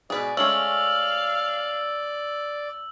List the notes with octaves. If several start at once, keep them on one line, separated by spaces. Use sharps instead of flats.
G#2 B2 G#4 B4 D5
G#3 A3 C#4 F5 E6 F#7